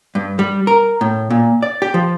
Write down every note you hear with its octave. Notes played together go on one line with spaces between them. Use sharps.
G2
G3
A#4
A2
A#2
D5
G4
F3